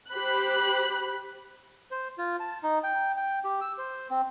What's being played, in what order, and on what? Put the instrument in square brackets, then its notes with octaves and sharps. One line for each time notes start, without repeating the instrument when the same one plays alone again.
[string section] G4 C5 B5 F#6
[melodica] C5
F4
A5
D#4
G5
G5
G4
E6
C5
C4